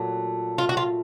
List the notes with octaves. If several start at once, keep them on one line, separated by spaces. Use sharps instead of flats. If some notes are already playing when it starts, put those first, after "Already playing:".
Already playing: A#2 F#3 A3
F4
F#4
F4